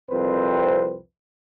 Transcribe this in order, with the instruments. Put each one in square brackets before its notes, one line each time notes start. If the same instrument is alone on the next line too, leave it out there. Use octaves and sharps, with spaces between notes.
[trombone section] C2 F2 C4 B4 C5